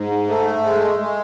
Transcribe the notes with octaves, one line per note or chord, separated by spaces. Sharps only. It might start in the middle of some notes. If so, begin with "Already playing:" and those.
Already playing: G#2
A3
G#3
G#3